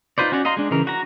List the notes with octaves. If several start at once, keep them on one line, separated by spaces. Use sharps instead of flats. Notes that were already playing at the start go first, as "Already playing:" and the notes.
D#4 F4 B4 C5 D5
C#4 F#4 C#5 D5
D#5 F5 A#5 C6
G#3 D4
C#3 E3 A#4
F#4 A#5